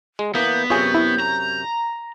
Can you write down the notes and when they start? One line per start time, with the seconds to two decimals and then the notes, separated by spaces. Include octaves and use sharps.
0.19 G#3
0.35 E3 A#3 B3 G6
0.70 F#2 C3 F4 G#4 C#5 G6
0.95 E4
1.20 A#5